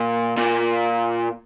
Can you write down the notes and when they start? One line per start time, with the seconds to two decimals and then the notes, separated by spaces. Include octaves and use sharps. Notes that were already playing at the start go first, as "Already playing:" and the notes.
Already playing: A#2
0.37 A#2